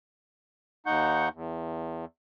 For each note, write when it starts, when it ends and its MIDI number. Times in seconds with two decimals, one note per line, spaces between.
0.86 1.29 39
0.86 1.29 63
0.86 1.29 78
0.86 1.29 85
0.86 1.29 91
1.34 2.05 40